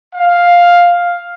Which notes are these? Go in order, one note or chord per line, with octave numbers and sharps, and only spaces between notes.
F5